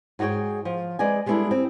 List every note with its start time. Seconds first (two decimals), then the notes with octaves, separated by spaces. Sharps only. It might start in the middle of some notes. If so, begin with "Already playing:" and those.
0.19 G#2 F#4 G#4 C#5 G5
0.65 F3
0.99 G#3 B4 D5 D#5 G#5
1.26 G3 G#3 B3 D4 E4 A4
1.51 C4